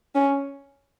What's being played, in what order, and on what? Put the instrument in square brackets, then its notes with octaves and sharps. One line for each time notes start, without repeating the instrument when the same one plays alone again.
[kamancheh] C#4